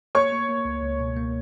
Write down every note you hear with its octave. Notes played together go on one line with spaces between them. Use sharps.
A#3 C#5 C#6
A#3
A#3
C#2
C#2
B2
A#3